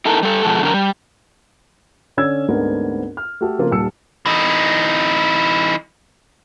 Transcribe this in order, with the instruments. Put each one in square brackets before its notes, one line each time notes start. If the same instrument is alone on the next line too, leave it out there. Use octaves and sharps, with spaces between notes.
[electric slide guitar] D#4 E4 A4 A#4
G3 A4
B2 F3 G#3 A4
F#2 D3 A#4
G3
[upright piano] D3 C#4 C#5 D5 E6 G#6
D2 G#2 B3 C4 D4 A#4
F6
A3 F#4 G4 A4
C#3 F3 A#3 C4 F4 A#4
D#1 D#2 A5 E6 C#7
[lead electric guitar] E3 D#4